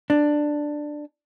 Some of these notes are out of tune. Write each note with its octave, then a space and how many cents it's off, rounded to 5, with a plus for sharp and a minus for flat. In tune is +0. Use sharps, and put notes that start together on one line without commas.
D4 +10